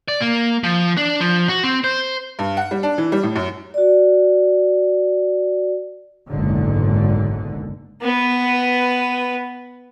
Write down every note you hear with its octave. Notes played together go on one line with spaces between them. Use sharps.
D5
A#3
F3
D4
F3
F#4
C4
C5
G2
F#5
G3
D4
E3
G3
A2
F#2
F#4 D5
F#1 B1 G#2 D3
B3 B4